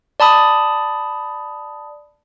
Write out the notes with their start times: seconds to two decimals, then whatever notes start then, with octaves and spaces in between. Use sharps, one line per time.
0.20 D5 A5 B5 D#6